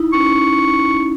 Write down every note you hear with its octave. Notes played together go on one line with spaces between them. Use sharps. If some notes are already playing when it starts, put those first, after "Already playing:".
Already playing: D#4 E4
C#4 C#6